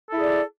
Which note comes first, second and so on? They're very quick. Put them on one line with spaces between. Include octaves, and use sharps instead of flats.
A4 E4 G#4 D5